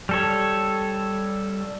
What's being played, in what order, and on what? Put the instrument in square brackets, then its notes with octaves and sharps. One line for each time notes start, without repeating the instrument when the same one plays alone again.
[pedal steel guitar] G3 A4 C#5